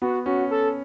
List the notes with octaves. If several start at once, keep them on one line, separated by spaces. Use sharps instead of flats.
B3 F#4
C#4 F#4
A4